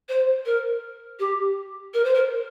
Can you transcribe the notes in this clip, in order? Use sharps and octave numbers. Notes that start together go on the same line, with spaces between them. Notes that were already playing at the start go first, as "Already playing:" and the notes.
C5
A#4
G4
A#4
C5
A#4